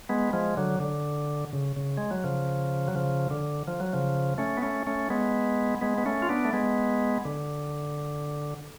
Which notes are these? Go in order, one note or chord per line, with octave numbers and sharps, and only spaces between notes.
G#3 B3
F3 G#3
D3 F#3
D3
C#3
C#3
G#3
F#3
C#3 F3
F#3
C#3 F3
D3
F3
F#3
C#3 F3
A3 C#4
B3
A3 C#4
A3 C#4
G#3 B3
G#3 B3
B3
A3 C#4
F4
B3 D4
A3
G#3 B3
D3